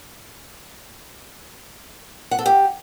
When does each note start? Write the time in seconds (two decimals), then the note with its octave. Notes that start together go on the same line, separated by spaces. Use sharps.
2.31 F#5
2.39 A4
2.46 G4